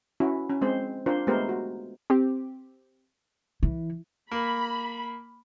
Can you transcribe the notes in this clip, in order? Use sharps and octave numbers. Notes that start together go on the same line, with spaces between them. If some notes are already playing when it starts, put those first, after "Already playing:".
C#4 E4 F#4
C#4
G#3 C4 C5
D4 F4 A#4 C5
G#3 A3 B3 G4 A#4 C5
F#4
C4 G4
E3
A#3 B5